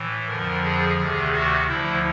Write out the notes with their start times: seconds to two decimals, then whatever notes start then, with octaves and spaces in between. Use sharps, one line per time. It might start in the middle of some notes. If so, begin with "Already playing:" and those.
Already playing: A2 E3
0.27 F2 D3 F3 A#4
0.63 G#4
0.97 D2 C3 D#3 G#4
1.32 F#4
1.66 D2 D3 F3 E4